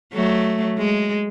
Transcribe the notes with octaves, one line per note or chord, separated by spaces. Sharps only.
F#3 A3
G#3